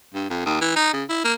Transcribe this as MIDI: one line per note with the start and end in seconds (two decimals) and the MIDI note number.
0.14 0.26 43
0.30 0.43 41
0.45 0.58 39
0.61 0.71 52
0.76 0.91 63
0.93 1.04 49
1.09 1.21 64
1.24 1.33 58